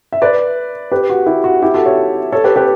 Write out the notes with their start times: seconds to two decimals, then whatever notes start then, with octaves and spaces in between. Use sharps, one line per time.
0.13 E5
0.22 B4 D5
0.92 G4 B4
1.10 F#4
1.26 E4 G4
1.44 F#4
1.62 E4 G4
1.74 F#4 A4
1.85 C#5 E5
2.32 A4 C#5
2.44 G4 B4
2.56 G4 B4